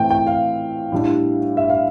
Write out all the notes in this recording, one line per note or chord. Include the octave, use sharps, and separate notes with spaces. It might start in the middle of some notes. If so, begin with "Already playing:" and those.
Already playing: A2 E3 A3 C4 G5
G5
F5
A2 G3 D4
E5
F5